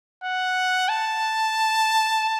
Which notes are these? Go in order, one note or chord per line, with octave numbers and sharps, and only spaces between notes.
F#5
A5